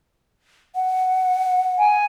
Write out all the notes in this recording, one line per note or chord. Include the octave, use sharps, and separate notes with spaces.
F#5
G#5